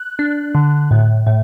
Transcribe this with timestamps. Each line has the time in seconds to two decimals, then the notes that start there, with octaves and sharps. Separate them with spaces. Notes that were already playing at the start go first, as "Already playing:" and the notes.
Already playing: F#6
0.19 D4
0.55 D3
0.91 A2
1.27 A2